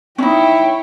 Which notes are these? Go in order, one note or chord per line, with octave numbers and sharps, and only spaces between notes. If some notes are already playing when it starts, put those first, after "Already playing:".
C#4 D#4 E4 C#5 G5